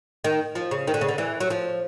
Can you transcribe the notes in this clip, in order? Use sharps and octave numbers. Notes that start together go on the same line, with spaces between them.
D#3
F3
C#3
D#3
D3
C#3
D3
E3
F#3
F3